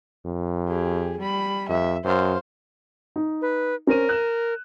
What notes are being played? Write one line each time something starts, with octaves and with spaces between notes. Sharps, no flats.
F2
G4 G#4
G3 B5
F2 E5
F#2 C5 F5
D#4
B4
C#4 A#4 C5 D#7
F#6 E7